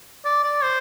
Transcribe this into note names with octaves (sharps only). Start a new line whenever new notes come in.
D5
D5
C5